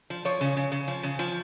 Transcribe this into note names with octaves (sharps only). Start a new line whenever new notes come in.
F3
F3 C#5
C#3
C#3
C#3
F3
C#3
F3